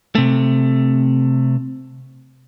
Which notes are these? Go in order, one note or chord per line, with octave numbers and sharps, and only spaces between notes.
C3 A3